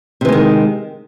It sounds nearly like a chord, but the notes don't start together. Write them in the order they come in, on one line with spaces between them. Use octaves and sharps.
C3 E3 G#3 D#3